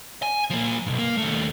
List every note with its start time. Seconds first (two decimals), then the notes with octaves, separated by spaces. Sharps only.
0.23 G#5
0.50 F3 A#3
0.87 B1 G2
0.98 A#3
1.17 D#2 A3